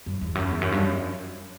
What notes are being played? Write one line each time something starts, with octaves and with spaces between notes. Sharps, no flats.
F#2
E2
F#2
E2
F#2
G2
F#2